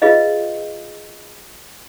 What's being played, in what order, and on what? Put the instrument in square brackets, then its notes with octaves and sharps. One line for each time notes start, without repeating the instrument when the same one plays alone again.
[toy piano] F4 G#4 B4 D#5 F5